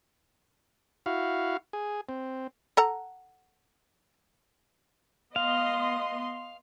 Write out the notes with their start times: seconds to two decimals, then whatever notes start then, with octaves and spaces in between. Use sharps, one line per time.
1.06 E4 F#4 F5
1.73 G#4
2.09 C4
2.77 A4 F#5 A#5
5.36 B3 D#5 F5 C6